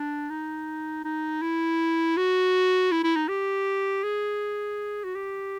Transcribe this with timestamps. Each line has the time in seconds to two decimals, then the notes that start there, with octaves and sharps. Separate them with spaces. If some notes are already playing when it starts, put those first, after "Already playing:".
Already playing: D4
0.30 D#4
1.04 D#4
1.42 E4
2.17 F#4
2.91 E4
3.03 E4
3.16 D#4
3.28 G4
4.03 G#4
5.04 F#4
5.15 G4